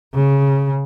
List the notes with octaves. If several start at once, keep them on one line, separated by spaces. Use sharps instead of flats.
C#3